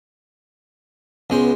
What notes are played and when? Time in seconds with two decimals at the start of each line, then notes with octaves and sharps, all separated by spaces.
1.30 C#2 G#3 B3 C5